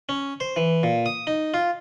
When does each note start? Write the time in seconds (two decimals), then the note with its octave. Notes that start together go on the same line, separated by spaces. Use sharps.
0.09 C#4
0.40 C5
0.56 E3
0.83 A#2
1.06 D#6
1.27 D#4
1.54 F4